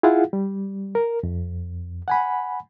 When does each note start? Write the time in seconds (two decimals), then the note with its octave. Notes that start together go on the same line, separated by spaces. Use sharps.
0.03 E4 F4 G#4 F5 F#5
0.33 G3
0.95 A#4
1.23 F2
2.08 F#5 G#5 B5